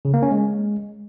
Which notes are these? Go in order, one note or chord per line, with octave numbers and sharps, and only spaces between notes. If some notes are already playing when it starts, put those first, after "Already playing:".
C#3
A#3
C#4
G#3